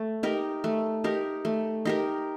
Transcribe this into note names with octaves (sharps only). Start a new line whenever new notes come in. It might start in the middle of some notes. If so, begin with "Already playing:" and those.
Already playing: A3
D#4 G4 A#4
A3
D#4 G4 A#4
A3
D#4 G4 A#4